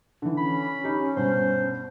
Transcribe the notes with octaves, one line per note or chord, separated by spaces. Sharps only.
D3 E3
C#4 B5
D#4 G4
G2 B2 C5